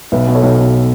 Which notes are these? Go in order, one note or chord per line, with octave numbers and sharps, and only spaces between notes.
B1 B4 E5
B2
A4 C#5
B1
B2